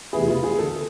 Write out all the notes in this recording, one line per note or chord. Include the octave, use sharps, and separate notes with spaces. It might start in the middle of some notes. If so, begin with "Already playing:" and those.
E2 C3 E3 A3 E4 G#4
F4
G#4
D3 A4